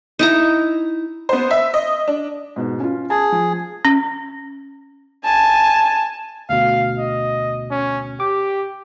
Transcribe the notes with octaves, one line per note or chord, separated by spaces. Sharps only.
D#4 E4 A#5
B3 C5
E5
D#5
D4
G#2 B2
C#4 F4
G#4 A5
F3
C#4
G#5 A5
D2 B2 F5
D#5
C#4
G4 D6